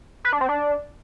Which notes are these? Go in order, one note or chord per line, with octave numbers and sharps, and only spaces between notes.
B4
D4
C4
D4